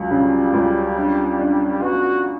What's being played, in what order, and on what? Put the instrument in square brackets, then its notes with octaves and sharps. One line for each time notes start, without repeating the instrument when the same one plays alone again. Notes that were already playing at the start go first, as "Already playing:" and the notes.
Already playing: [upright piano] C#2 F#3
[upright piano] C#3 [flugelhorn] G3
[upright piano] C#2
D4
D4
[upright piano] B3 [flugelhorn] F#4